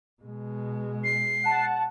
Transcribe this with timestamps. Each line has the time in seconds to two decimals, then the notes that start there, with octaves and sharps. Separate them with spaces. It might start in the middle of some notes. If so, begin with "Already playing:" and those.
0.22 B2 G#3
1.04 C7
1.43 F#5 A5